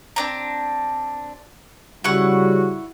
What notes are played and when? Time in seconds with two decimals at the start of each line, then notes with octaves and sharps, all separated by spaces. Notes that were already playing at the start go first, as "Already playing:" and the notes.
0.16 C4 D4 A#5
2.04 C#3 G3 E4 F#4 F#5 C#6